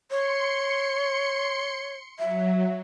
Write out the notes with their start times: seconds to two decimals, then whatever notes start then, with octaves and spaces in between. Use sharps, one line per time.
0.11 C#5 C6 C#7
2.19 F#3 E5